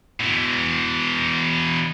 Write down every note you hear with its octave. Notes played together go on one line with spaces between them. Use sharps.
B2 E3